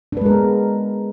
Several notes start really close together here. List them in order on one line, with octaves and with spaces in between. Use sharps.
D4 B4 G#3 A#4 B3